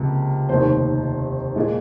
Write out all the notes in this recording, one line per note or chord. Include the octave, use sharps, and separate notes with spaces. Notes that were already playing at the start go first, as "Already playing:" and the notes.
Already playing: C#2 C3 F3 A#3 A#4
F1 D#2 D#3 C5
A#2 G#3